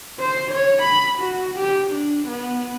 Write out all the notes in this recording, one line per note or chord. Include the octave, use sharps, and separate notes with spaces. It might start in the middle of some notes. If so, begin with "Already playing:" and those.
C5
C#5
B5
F#4
G4
D4
B3